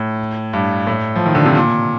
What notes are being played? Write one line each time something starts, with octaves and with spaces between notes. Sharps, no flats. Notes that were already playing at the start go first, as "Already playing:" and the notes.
Already playing: A2
G2
A2
F3
D#3
D3
C3
A#2